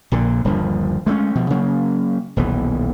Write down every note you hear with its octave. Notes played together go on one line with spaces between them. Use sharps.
A#1 A#2 D3
D#1 G2 D3 F3
G#3 A3 B3 C#4
B2 F3
C#3 F#3 A#3
D#1 B1 E3 B3